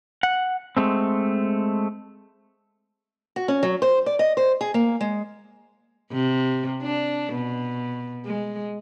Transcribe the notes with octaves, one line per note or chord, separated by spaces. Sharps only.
F#5
G#3 A3 C4
F#4
C#4
F#3
C5
D5
D#5
C5
G#4
A#3
G#3
C3
D4
B2
G#3